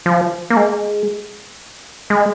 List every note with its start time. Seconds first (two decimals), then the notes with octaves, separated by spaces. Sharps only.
0.06 F3
0.50 A#3
0.57 G#3
2.10 G#3